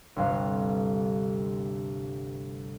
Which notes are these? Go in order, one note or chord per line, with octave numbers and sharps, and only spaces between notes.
G1 D2 C3 B3 F5